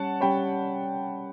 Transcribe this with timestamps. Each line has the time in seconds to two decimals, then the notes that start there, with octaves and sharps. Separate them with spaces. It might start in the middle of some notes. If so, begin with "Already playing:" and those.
Already playing: G3 C#4 G4 C#5 F#5 A5
0.21 G3 C#4 G4 C#5 G5 B5